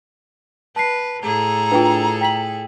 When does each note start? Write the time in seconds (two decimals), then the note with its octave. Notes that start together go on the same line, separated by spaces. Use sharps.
0.76 B4 A5 C7
1.23 A2 G#4 A4 A#5
1.71 D4 F4 B4 G5
2.21 G5 B6 F#7